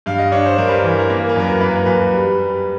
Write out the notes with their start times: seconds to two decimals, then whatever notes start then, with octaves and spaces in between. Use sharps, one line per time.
0.06 G2 F5
0.18 D#5
0.32 D4 C#5
0.45 C5
0.58 G2 A#4
0.68 B4
0.78 A#4
0.83 E3 B4
0.99 A#4
1.09 A#3 B4
1.19 A#4
1.29 B4
1.36 F#2 A#4
1.61 A#3 B4
1.76 A#4
1.86 F#2 B4
2.12 G3
2.38 G3